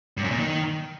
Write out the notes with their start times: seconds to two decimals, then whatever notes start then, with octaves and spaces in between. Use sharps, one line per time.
0.17 G2
0.24 F#2
0.31 A#2
0.38 D#3